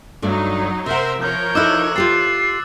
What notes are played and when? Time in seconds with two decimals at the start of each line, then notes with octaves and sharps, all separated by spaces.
0.22 G2 F#3 A3 D#4 D5
0.86 C3 A#4 C5 E5 F#5
1.21 F3 A#4 C#5 G6
1.55 D#4 E4 A4 D6 E6 F#6
1.96 F4 G4 G5 A6 C7